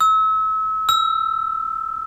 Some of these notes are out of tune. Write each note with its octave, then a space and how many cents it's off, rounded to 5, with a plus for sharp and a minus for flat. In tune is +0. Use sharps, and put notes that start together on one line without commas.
E6 -35
E6 +15